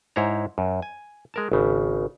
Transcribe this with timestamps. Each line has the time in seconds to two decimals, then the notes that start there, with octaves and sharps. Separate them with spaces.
0.16 G#2 E4 C5 C#5 A#5
0.58 F#2
0.82 G#5
1.34 G#3 A#4 A5
1.52 G#1 C#3